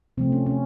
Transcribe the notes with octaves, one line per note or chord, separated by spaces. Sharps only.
C3 F3 A3 C4
C#4
C#4